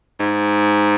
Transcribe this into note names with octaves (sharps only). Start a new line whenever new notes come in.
G#2